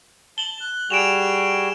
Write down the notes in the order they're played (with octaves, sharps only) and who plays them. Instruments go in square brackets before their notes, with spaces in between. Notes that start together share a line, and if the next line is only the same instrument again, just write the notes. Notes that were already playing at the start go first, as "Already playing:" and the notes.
[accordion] A5 [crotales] F#7 G7
[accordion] F#6
[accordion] G3 F#4 G#4 [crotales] D7 E7 F7